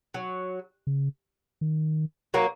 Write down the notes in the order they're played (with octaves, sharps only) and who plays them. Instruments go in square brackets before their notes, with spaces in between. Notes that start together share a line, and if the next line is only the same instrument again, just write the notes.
[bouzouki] F#3
[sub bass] C#3
D#3
[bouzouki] F#3 A#3